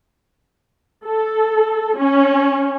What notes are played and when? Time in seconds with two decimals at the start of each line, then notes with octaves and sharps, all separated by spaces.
1.06 A4
1.98 C#4